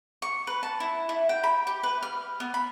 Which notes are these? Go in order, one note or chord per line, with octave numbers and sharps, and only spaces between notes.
C#6
B4
A5
E4
E4
G5
B5
G4
B4
F6
B3
B5